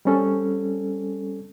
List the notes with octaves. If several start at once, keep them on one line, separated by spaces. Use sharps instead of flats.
G3 C4 C#4 A4